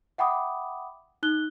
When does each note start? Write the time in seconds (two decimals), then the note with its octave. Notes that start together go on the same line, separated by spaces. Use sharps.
0.18 E5 F#5 G5 B5 D6 D#6
1.23 D#4 F#6 G7